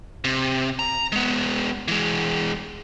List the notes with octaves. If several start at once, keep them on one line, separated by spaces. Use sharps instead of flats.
C3
A#5
G#3 B3
E3 G#3